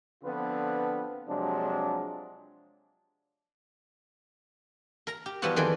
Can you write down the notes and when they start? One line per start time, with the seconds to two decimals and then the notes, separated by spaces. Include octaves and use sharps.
0.24 D3 F3 B3 C4 F4 B4
1.28 C3 F3 F#3 G#3 D4
5.07 A#4 A#5
5.26 G4
5.42 E3 F3 G3 B3 F4 F#4
5.56 F2 D#3 E3 G#4 D5 C6